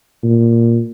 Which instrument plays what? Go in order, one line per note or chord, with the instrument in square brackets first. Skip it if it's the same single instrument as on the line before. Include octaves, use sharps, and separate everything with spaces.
[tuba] A#2